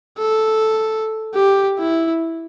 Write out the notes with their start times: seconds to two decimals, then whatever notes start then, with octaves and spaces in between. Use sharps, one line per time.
0.18 A4
1.35 G4
1.79 E4